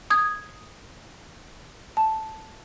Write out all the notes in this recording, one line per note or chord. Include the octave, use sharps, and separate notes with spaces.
D#6 G#6
A5